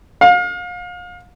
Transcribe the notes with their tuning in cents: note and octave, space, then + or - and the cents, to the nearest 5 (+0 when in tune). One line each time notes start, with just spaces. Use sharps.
F5 +35